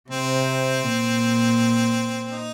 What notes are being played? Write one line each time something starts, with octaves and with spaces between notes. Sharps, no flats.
C3 C4
A#2
D#4